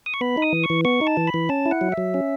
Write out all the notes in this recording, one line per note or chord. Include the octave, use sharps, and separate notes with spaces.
D#6
C#6
B3 B5
D#4 D#6
E3
C#6
E3
B3 C#6
D#4
A5
E3
B5
E3
C#4 A5
E4
F#5
F#3
E5
F#3
C#4